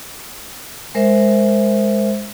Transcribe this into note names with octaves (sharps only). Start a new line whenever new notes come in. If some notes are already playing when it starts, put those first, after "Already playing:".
G#3 A#4 C5 E5